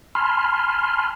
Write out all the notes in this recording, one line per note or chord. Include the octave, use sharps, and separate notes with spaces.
G#5 A5 B5 C6 F6